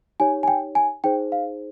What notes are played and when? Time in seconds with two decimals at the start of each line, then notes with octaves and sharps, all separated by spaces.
0.20 D#4 G4 C#5 G#5
0.43 G#5
0.48 G5
0.75 G#5
1.04 D#4 G#4 C5 G5
1.32 F5